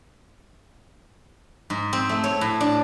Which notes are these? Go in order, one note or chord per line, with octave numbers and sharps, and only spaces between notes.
G#2
C4
A3
C#5
A2
D4